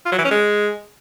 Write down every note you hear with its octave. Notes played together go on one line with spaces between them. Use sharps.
F4
F#3
E3
C#4
G#3